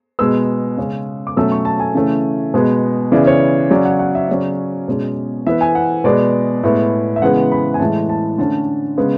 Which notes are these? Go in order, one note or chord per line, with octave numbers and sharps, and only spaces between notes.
B2 G#3 B3 E6
C#3 G#3 C#4
D6
B2 F#3 A3 C#4 E6
C#6
A5
G#5
C#3 E3 A3 C#4
B2 G#3 B3
C#3 E3 B3 D5
C#5
C#3 F#3 C#4 D5
F#5
F#5
E5
C#3 F#3 C#4 D5
B2 G#3 C#4
E3 B3 E5
G#5
F#5
B2 G#3 B3 D5
A2 G#3 B3
E5
C#3 E3 G#3 B3 F#5
B5
G#5
A2 E3 G#3 A5
A5
D3 A3 C#4 A5
C#3 G#3 B3